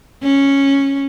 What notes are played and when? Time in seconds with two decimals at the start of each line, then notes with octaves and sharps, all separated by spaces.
0.23 C#4